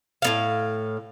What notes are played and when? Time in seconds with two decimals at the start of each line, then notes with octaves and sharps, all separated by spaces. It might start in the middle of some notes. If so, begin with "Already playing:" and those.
0.22 A2 B3 F5